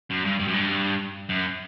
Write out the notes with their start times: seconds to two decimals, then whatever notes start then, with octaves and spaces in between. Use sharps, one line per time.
0.10 F#2
0.25 G2
0.40 G2
0.48 F#2
0.54 G2
1.29 F#2